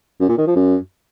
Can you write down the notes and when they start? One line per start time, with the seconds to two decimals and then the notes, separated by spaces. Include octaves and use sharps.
0.20 F#2
0.29 A#2
0.38 D#3
0.47 F3
0.56 F#2